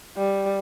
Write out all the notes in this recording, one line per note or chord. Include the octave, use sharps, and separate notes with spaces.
G3